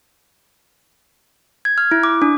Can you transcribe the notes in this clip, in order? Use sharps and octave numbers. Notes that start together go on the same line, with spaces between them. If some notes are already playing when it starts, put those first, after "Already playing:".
G#6
F6
E4
D6
D4